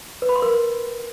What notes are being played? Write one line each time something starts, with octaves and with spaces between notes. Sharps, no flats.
B4
B5
C6
A#4
C6